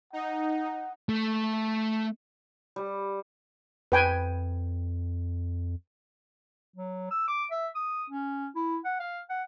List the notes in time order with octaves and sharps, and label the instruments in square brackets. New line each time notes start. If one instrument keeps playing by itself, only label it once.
[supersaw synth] D#4 [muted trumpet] F#5
[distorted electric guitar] A3
[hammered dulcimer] G3
[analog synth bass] F2 [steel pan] B4 G5 G#5
[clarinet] F#3
E6
D6
E5
D#6
C#4
E4
F#5
F5
F#5